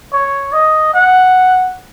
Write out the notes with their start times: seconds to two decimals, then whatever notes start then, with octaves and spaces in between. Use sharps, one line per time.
0.13 C#5
0.52 D#5
0.94 F#5